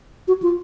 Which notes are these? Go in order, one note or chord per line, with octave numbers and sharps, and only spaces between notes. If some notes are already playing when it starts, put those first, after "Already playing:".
F#4
F4